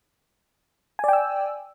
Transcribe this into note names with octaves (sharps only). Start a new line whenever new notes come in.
D5 G5 G#5 E6